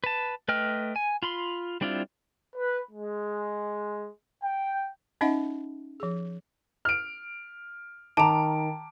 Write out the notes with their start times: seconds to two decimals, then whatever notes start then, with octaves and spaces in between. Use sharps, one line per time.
0.04 B4 A5
0.48 A3 B4 D#5 G5 F6
0.96 G#5
1.23 F4 B5 C6
1.81 G3 C4 D4 E4 F4
2.56 B4
2.91 G#3
4.44 G5
5.21 C#4 D#4 D#5 E5 F#5
6.00 F3 G#4
6.85 F6 D7
8.17 D#3 A5 A#5 D6 D7